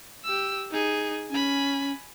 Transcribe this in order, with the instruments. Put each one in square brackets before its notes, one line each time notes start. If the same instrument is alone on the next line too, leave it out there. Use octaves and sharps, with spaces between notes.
[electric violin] G4 E6
D#4 G#4
[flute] C#4 [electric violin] G#5 B5